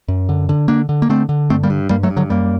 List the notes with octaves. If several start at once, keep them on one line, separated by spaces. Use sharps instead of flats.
F#2
D3
D3
D3 A#3 D4
D3
A#3
D3 A3 C4
D3
G2 A3 C4
G3 A#3
G2
G2 G3 A#3
F#3 A3
G2
D3 F#3
F#2 G3 A#3